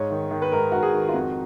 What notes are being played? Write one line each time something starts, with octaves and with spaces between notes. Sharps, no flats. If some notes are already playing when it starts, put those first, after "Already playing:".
Already playing: G#2 C#5
D#3
D#3
B4
G#2 A#4
G#2 F#4
G#4
D#3
F4
F2 F#4